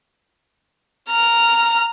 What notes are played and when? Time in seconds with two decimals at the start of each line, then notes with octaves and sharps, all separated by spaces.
1.09 A#5 F6